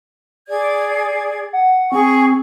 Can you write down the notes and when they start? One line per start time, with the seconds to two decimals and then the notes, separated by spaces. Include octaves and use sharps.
0.48 G#4 D5 G#6
1.53 F#5
1.92 C4 G#4 C#6